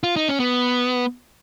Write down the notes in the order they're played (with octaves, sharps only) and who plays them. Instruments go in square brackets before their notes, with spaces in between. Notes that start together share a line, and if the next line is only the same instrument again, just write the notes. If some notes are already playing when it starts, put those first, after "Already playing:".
[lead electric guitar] F4
D#4
C#4
B3